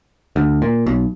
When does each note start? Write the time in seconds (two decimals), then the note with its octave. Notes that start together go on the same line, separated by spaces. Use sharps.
0.36 D2
0.62 A#2
0.86 B1